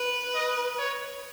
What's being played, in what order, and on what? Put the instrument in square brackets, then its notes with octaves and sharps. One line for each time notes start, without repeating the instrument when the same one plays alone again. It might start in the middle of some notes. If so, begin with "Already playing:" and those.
Already playing: [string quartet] B4
[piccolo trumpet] D#5
C#5